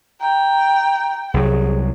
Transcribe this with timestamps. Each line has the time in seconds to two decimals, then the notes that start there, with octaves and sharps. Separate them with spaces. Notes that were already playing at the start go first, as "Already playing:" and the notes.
0.21 G5 A#5
1.34 C2 F#3 G#4